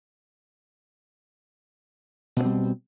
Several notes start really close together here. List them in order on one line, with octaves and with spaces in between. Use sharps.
B2 A#3 C4 G3